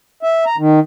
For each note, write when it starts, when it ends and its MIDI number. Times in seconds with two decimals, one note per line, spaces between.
0.23 0.45 76
0.46 0.56 82
0.58 0.79 51